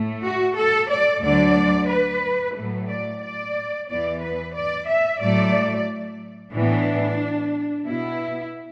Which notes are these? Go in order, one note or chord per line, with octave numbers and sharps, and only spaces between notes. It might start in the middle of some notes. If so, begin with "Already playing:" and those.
Already playing: A2 A3
F#4
A4
D5
D2 D3 F#3 D5
B4
A2 F#3 A3
D5
D5
E2 E3 B3 D5
B4
D5
E5
A2 F#3 A3 D5
A2 E3 B3 D4
B2 B3 E4